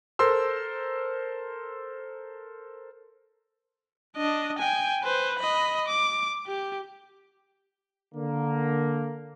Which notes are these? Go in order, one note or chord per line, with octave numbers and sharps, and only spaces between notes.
A4 A#4 C5 C6 E6
D4 D#5
G5 G#5
B4 C5
D#5 B5
D6
G4
D3 A#3